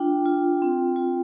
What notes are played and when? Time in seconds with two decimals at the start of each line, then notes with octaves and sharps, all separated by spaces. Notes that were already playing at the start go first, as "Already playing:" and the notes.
Already playing: D4 F4 G5
0.26 F4
0.62 C4
0.96 F4